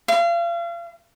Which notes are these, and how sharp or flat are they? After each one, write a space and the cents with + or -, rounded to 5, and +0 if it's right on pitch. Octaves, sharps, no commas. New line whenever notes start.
F5 -35